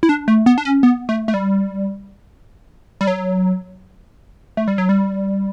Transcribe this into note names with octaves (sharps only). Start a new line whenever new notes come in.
E4
D4
A3
B3
D4
C#4
B3
A3
A3
G3
G3
F#3
A3
G3
F#3
G3